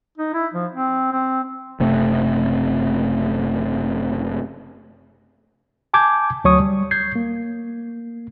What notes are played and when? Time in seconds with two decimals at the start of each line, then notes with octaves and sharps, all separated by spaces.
0.18 D#4
0.34 E4
0.54 F3
0.72 C4
1.12 C4
1.80 F#1 C3 A3 C4
5.94 G#5 A5 D6 G6 G#6
6.44 D2 F#3 C#5 C#6 D#6
6.60 G3
6.91 G6 G#6 C7
7.15 A#3